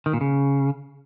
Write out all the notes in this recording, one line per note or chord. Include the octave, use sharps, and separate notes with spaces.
D#3
A#2
C#3